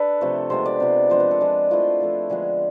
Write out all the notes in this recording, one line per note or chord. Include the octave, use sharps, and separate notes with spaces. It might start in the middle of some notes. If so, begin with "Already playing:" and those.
Already playing: D4 A4 B4
C3 F3 A3
C3 G#3 B3 F4 C5
D5
C3 G#3 B3 F4
F3 G#3 D4 C5
B4
A4
F3 G#3 D4
F3 A3 E4 F4
F3 A3 E4
D3 F3 G#3 B3 G#4